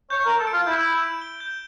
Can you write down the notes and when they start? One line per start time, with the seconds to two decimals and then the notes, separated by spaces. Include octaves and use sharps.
0.10 C#5 G6
0.25 A#4
0.29 G6
0.38 A4
0.47 D7
0.53 F4
0.67 E4 G6
0.85 G6
1.03 D7
1.22 G7
1.40 G6